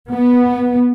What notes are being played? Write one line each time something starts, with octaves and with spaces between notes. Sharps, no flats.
B3